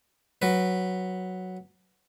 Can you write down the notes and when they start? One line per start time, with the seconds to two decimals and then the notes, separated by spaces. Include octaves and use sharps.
0.42 F#3 B4